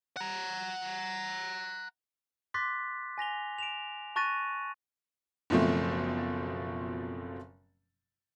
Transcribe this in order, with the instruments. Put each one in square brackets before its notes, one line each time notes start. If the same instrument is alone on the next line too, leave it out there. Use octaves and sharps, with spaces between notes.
[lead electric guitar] F#5 A#5
[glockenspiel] C6 D6 F#6 A6 B6
G#5 A#6 F7 G7
D7 E7 F7
A5 C#6 F#6 A6 A#6 D#7
[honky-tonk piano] F#1 B2 F3 A3 C4